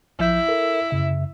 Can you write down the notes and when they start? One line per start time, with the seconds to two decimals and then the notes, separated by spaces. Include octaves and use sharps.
0.19 A#1 F3 E4 G6
0.48 A4 A#4
0.91 F#2 C#3 E5